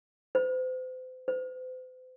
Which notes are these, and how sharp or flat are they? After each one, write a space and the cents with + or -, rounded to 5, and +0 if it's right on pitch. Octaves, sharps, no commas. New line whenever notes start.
C5 -40
C5 -45